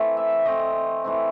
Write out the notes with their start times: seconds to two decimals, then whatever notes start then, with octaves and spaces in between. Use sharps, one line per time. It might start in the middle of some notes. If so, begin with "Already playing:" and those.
Already playing: E3 A3 C4
0.17 E5
0.45 E3 A3 C4 D#5
1.04 E3 A3 C4